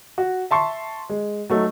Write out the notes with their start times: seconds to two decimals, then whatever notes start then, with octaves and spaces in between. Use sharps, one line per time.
0.18 F#4
0.51 E5 A5 C6 C#6
1.09 G#3
1.50 F#3 A3 D#4